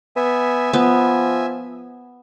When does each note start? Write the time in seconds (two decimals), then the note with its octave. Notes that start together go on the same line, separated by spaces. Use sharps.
0.16 B3 E5 G#5
0.73 F3 B3